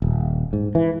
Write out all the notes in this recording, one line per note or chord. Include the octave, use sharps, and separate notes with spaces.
D#1
G#2
E3